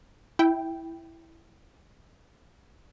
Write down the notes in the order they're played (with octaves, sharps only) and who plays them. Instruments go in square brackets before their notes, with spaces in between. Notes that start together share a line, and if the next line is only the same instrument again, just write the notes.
[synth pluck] E4 G5